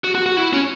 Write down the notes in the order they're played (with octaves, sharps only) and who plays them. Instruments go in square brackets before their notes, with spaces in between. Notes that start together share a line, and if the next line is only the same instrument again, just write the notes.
[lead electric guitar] F#4
F#4
F#4
E4
C#4